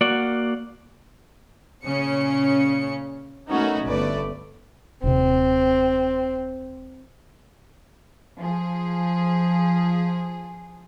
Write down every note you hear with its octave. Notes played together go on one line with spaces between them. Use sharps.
A#3 F#4 D5 F#5
A#2 C#3 C#4 C#7
A3 B3 C#4 D#4 F#4 A#4
G1 A3 B4 D5
D#1 C3 C4
F3 G#4